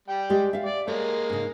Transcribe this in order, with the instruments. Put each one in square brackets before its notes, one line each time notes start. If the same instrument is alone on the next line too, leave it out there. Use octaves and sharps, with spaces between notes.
[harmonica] G3 G5
[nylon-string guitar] G#3 G4 D5
E5 F5
[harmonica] D5
[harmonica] G#3 A#3 [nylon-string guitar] C#5
[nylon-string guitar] G#2 C#3